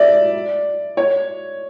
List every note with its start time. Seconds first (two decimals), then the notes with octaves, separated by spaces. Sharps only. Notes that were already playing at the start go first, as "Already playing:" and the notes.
Already playing: D5 E5
0.97 C#5